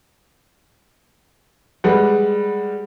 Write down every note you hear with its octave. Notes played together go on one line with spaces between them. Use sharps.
G3 G#3 B4 F#5